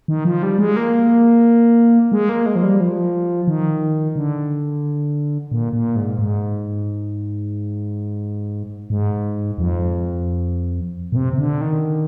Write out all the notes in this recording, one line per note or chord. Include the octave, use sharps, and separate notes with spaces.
D#3
F3
G3
G#3
A#3
G#3
A#3
G#3
F3
G3
F3
D#3
D3
A#2
A#2
G#2
G#2
G#2
F2
A#2
C3
C3
D3
D#3